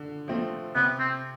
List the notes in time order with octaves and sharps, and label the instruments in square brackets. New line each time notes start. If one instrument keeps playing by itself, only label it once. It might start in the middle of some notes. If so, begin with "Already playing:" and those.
Already playing: [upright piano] D3
F3 A3 C4
[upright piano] C3 [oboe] B3
[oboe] C4